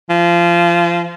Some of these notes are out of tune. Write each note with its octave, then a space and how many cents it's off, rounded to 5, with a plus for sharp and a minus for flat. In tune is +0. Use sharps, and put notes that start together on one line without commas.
F3 -25